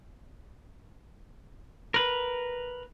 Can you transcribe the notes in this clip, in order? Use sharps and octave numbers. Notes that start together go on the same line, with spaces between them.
A#4 B4